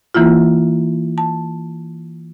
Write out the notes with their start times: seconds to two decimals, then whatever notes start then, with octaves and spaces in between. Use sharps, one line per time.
0.14 E3 A#3 E4 F4
1.18 A5